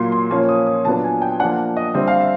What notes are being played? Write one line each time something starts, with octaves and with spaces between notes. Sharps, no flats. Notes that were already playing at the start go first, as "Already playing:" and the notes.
Already playing: A#2 F#3 A#3 C6
C6
A#2 F3 A#3 C#4
D#6
D#6
A#2 F#3 B3 D4 A5
G#5
G5
F3 A#3 D4 F#5
D#5
D3 G3 C4 E5
F5
E5